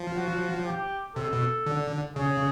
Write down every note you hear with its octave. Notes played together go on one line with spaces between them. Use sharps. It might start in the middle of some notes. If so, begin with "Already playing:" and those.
Already playing: F3
F#4
G4
C3 A4
B2
D3
C#3 G#4